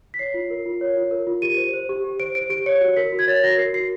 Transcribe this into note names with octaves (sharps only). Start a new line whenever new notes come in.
B6
C#5 C7
F4
A#4
F4
C#5
F4
A#4
F4
G4 D#7
C5
C5
G4
G4
C5 D7
C5 D7
G4 D7
C#5 C#7
F#4
A#4 B6
F#4
G#6
C#5 A6
F#4 A#6
A#4 C7
F#4 C7